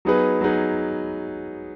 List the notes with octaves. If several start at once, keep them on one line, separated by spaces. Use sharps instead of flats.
F#3 B3 D#4 G#4 B4
F#3 B3 D#4 G#4 B4